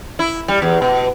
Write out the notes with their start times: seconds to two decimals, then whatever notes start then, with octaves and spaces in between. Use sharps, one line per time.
0.19 E4
0.48 G3
0.62 E2
0.82 B2